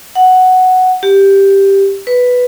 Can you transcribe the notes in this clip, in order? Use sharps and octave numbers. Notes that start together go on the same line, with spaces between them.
F#5
G4
B4